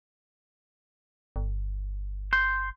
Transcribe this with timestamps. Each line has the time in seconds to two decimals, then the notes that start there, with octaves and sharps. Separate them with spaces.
1.36 G1
2.33 C6 G6